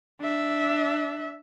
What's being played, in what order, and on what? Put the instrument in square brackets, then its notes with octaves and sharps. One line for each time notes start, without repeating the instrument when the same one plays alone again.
[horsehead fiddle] D4 E5